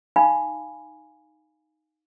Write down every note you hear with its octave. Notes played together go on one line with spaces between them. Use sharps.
D#4 F5 G#5 B5